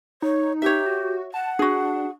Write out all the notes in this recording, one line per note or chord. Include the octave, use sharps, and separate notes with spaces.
D#4 C#5
G4 C#5 E5
F#4
F#5 A5
D4 F#4 G#4